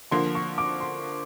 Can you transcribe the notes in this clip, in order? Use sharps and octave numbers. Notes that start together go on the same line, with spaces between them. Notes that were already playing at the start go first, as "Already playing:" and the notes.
D3 F3 A#3 C6
C#6
D6
C6